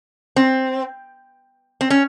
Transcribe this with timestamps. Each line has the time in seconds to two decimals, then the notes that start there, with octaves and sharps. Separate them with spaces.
0.36 C4
1.81 C4
1.90 C#4